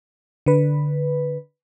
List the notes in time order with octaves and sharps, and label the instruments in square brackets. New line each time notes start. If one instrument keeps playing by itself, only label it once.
[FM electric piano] D3 B4